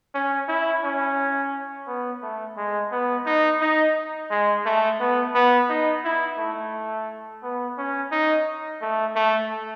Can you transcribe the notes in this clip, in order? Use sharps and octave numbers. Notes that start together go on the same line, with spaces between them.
C#4
E4
C#4
B3
A3
G#3
B3
D#4
D#4
G#3
A3
B3
B3
D#4
E4
A3
B3
C#4
D#4
A3
A3